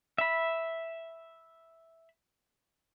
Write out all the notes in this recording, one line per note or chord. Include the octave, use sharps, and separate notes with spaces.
E5 B5